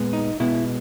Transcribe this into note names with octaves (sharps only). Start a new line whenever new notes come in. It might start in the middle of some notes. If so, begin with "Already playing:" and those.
Already playing: A#2 G#3 B3
D#4
B2 G#3 B3 E4